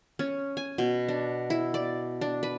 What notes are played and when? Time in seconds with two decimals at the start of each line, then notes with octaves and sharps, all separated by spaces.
0.19 C#4
0.57 G#5
0.78 B2
1.08 D4
1.50 E4
1.74 D5
2.21 D4
2.43 B4